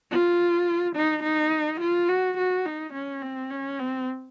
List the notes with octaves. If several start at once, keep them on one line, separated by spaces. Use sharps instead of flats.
F4
D#4
D#4
F4
F#4
F#4
D#4
C#4
C4
C#4
C4